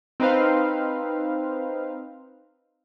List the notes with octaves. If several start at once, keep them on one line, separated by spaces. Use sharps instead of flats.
C4 D#4 B4 C5 F5